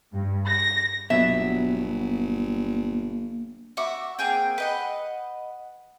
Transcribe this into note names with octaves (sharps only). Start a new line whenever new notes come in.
G2
A#6
G1 B2 F#3 A#3 E5
F#4 E5 D6
A#3 C4 G#4 G5
B4 D#5 F#5